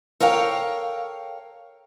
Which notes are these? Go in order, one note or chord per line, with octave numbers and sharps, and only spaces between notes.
A4 A#4 C#5 F5 G5